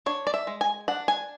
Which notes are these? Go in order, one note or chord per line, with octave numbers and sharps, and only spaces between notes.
D4 C#5
D5
E5
G#3
G#5
D4 F#5
G#5